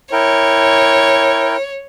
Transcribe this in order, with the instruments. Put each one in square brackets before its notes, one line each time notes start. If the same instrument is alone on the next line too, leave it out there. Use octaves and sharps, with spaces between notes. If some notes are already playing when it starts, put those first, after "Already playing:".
[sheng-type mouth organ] E4 A#4 G5 [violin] C#5